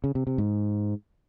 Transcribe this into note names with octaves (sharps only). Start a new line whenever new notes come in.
C#3
C3
C3
G#2